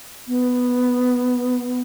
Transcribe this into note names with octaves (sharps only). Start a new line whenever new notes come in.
B3